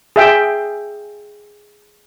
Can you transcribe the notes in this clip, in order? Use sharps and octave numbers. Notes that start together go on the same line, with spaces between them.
G#4 E5 G5